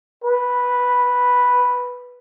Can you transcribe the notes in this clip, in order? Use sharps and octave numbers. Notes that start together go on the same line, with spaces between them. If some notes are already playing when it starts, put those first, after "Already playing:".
B4